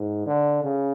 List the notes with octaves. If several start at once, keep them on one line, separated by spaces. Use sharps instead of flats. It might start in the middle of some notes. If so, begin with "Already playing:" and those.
Already playing: G#2
D3
C#3